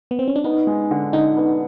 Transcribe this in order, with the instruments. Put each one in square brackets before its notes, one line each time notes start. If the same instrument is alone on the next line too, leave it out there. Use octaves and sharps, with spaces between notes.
[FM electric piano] B3
C4
C#4
D4
[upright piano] B3 [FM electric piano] D#4
[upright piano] G#3
D3
[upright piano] D3 [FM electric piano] D#4
[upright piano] B3